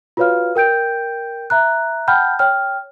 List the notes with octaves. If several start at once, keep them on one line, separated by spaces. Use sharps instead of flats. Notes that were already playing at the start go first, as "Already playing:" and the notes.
F4 F#4 B4 C#5 F5 F6
A#4 G5 G6 D7
E5 A#5 F#6
F#5 G5 A5 B5 F6 G6
C#5 G5 F6